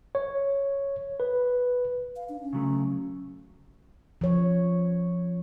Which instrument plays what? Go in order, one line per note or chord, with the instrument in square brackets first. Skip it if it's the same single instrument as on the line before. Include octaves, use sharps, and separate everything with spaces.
[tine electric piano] C#5
B4
[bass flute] F5
D4
C#4
[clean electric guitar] C#3 F#3 A3
[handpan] F3 C#5